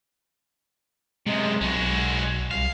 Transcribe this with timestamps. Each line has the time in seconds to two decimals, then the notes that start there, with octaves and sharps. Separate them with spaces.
1.27 F#2 C3 G#3
1.61 B1 G#3 F#4
2.51 C2 F5